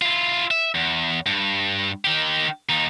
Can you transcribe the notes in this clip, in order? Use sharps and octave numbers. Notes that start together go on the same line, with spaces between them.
E4 F4
E5
E2
G2
D#3 G4
D#2 D#4